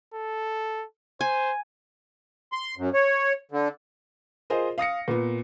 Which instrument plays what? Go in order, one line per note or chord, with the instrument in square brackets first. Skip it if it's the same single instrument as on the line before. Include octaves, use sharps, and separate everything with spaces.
[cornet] A4
[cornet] C5 [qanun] G#5
[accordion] C6
F#2
C#5
D3
[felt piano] F4 G#4 A#4 C5 D#5
F5 D#6 A#6 C#7
A#2 B3